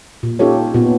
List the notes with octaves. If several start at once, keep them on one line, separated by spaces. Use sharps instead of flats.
A#2
C#4 D#4 F4 G4 A4 C#5
A#2 B3